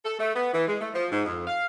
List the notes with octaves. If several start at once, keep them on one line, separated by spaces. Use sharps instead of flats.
A4
A3
B3
E3
G#3
A3
F3
G#2
F2
F5